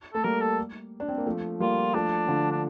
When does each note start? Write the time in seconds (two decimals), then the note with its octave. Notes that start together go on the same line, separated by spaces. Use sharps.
0.13 A3 A4
0.24 G3 A#3 A#4
0.41 A4
1.00 D4
1.08 C4
1.18 A#3
1.26 F3 A3
1.60 G3 A#3 F4
1.94 F3 A3 D4
2.28 D3 F3
2.52 D4